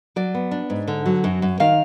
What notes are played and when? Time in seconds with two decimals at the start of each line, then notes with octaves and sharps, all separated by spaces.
0.16 F#3 D5
0.34 B3
0.51 D4
0.70 G#2
0.88 D3
1.06 F#3
1.24 F#2
1.42 F#2
1.60 D#3 F5